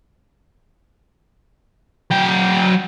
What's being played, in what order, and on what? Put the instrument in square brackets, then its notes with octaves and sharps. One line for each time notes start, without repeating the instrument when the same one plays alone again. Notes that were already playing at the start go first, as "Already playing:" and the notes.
[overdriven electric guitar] F#3 G5